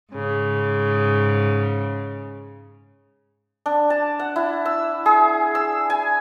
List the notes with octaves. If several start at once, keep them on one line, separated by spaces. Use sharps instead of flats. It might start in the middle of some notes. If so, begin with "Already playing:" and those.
G#2 C#3
D4
A5
F#5
E4
E6
G#4
E6
G#5